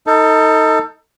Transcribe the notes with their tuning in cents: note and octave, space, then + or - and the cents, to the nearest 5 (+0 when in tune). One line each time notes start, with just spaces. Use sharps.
D#4 +20 A4 +30 A5 +0